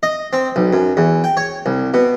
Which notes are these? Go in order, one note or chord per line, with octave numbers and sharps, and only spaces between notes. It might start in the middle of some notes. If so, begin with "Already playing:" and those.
D#5
C4
B1
F#2
E2
G5
C#5
C2
B2